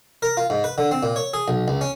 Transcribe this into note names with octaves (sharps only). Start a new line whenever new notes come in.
A#4
F4
G#2
B4
D3
C4
A#2
C#5
G#4
B1
C#2
C#4